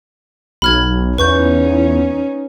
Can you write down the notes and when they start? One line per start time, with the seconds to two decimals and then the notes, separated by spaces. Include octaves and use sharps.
0.62 B1 B5 F6 G#6
1.18 E2 C#4 D#4 B4 C#6 G6